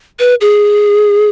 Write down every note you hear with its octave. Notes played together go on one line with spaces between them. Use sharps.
B4
G#4